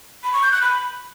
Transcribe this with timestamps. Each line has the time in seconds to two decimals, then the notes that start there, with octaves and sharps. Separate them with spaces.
0.24 B5
0.33 C#6
0.43 G6
0.52 F#6
0.62 B5